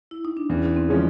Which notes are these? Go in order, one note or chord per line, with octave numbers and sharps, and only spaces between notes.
E4
D#4
D4
E2 C#4
C4
C#3 F3 G#3 C#4